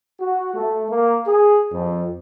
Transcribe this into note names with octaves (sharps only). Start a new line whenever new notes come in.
F#4
A3
A#3
G#4
F2